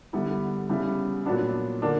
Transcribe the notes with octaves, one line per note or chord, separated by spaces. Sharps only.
D3 G3 B3 E4
C#3 G3 B3 E4
A#2 F#3 B3 D4
D3 A#3 D4